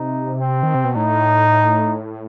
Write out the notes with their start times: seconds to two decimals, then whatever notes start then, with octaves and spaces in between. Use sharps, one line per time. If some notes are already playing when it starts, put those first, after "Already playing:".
Already playing: C3 D#4
0.41 C4
0.63 D#3
0.75 C3
0.84 B2
0.96 A2 D#4